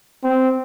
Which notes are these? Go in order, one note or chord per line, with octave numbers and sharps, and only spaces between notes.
C4